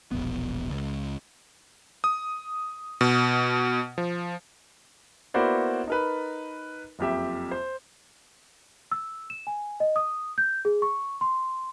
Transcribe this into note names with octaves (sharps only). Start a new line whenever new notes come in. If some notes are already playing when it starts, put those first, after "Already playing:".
E1 A#1 B3
C#2
D#6
B2
F3
A#3 B3 E4 F#4 C5 D5
D#4 A#4 B4
F#1 F2 G4 E5
C5
E6
E7
G#5
D#5
D#6
G6
G#4
C#6
C6